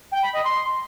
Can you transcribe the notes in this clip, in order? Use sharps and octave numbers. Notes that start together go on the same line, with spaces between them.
G5
B5
D#5
C6